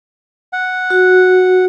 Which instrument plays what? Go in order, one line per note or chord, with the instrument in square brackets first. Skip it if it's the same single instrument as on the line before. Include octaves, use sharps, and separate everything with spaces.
[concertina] F#5
[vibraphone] F#4